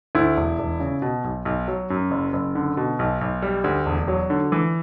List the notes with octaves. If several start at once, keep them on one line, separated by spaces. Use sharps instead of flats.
D2 E4
E1
E1
C#3
B2
B1
B1
F#3
F#2
F#1
F#1
D3
B2
B1
B1
G3
D2
E1
F#3
D3
E3